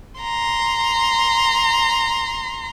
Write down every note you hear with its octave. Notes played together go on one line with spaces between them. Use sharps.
A#5 C6